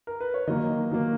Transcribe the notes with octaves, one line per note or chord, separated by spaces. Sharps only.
A#4
B4
C#5
D#3 F#3 A#3 D#5
D#3 F#3 A#3